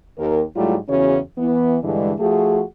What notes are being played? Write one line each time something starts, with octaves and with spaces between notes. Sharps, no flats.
D#2 A#4
G#2 F#3 G3 A3 E4 F4
E2 C#3 E3 C#4 F#4 C#5
E3 B3
G2 D3 E3 G#3
F3 A3 F#4 G#4